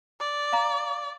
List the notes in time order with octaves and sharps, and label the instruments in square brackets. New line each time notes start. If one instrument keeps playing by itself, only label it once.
[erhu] D5
[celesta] F5 A#5